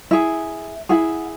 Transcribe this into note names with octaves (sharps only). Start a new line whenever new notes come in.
E4 G#4 E5
E4 G#4 F#5